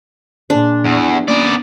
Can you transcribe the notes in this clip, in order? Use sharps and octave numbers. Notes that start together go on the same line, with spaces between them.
A#2 D4 G#4
E2
E4 G4 B4
A#3 B3 C#4 D5